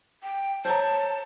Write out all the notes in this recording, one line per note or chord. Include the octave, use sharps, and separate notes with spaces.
G5
C5 C#5 A5 A#5